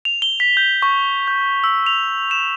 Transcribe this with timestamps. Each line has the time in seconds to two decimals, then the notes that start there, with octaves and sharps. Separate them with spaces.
0.05 F7
0.22 G7
0.40 B6
0.57 G6
0.82 C#6
1.28 G6
1.64 E6
1.86 F7
2.31 E7